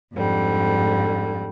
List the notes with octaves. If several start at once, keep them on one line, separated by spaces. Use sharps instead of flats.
F2 G#2 D3 G3